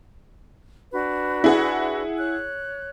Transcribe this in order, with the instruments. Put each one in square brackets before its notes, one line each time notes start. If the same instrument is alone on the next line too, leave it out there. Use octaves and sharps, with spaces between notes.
[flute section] D4 F#4 B4
[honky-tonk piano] E4 G#4 F#5
[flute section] C#5 F#6